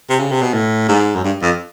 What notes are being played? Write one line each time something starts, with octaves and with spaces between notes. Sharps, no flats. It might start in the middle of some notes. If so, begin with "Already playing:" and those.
C3
C#3
C3
B2
A2
G#2
F#2
G2
F2